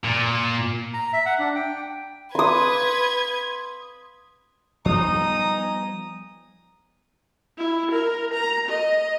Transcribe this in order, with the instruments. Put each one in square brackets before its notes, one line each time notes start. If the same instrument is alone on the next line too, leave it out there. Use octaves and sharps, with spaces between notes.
[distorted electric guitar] A#2
[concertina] A#5
E5
F#5
D4
G5
[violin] B4 G#6 [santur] C6 D#6
[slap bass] F3 G3 B3 [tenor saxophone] D#4 [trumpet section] G#5 A#5 [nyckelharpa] D#6
[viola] E4
A#4
A#5
D#5